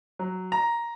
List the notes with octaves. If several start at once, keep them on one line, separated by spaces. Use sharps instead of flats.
F#3
A#5